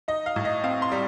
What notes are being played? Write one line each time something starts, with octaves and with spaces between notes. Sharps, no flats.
D#4 D#5
F5
A2
D#5
C4 F5
C6
G3